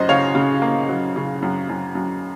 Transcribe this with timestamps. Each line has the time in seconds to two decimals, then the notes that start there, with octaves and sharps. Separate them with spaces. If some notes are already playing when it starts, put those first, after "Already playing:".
Already playing: F#2 F#4 C5 D#5
0.09 C#3 C#5 F5
0.35 C#3
0.62 A#3
0.89 F#3
1.16 C#3
1.42 F#2
1.69 F#2
1.95 F#2